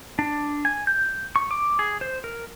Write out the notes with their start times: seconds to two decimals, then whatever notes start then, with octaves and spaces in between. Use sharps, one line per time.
0.19 D4
0.65 G#5
0.87 G6
1.36 C#6
1.51 D6
1.79 G#4
2.01 C5
2.24 A#4